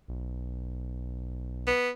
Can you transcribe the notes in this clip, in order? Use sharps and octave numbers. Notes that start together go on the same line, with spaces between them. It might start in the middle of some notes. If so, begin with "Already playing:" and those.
B1
B3